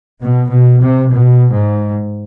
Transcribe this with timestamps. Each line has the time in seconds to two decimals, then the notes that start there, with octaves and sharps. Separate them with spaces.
0.21 B2
0.50 B2
0.80 C3
1.09 B2
1.53 G#2